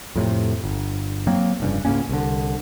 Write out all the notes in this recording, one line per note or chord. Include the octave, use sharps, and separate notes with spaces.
F2 A2 C3
G1
F#3 A#3 C4
F1 G2 C#3
C#2 G#2 A#3 C#4
C2 D3